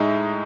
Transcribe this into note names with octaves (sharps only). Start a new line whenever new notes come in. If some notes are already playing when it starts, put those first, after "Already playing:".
Already playing: A2 G#3 D#4 E5